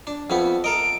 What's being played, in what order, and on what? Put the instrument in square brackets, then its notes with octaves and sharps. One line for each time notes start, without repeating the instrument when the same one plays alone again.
[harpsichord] D4
F2 A3 B3
[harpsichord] A4 A#4 D#5 [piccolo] D7